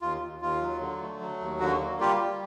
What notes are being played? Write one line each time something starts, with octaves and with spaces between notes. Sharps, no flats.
D#2 F4
D#2
D#2 F4
F#3
D3
A3
F#3
D#2
D3 F#4
A#3
G3 F4 G4
G3